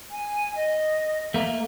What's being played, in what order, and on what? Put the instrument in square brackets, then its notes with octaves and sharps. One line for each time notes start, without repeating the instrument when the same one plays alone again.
[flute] G#5
D#5
[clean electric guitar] A3 A#3